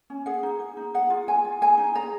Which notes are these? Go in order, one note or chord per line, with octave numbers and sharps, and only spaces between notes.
C#4
G#4 F#5
D#4
G#4
D#4
G#4 F#5
F4
G#4 G#5
F4
G#4 G#5
D#4
G#4 A#5